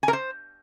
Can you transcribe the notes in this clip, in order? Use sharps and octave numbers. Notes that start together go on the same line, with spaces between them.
G#5
A#4
C5